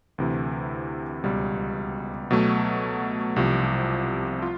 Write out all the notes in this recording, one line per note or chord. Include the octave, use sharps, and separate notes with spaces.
D2 C3 E3
C#2 B2 G3
B2 F#3 A3
C2 C3 F3
F4